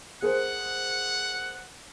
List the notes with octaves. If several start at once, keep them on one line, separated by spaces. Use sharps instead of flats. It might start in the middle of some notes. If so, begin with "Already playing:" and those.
G#4 A#4 C5 F#5